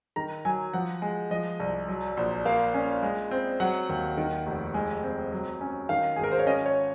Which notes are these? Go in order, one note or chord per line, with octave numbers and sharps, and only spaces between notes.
D#3 A#5
F#3 G#5
F3 F#5
G#3
F3 D#5
C2
F#3
A#1
A#3 F5
C#4
G#3
C4
F#3 F#5
D#2
D#3
F1
G#3
C4
F#3
C#4
D#3 F5
G#1 G#4
A#4
C5
C#5
C#4 D#5
C#5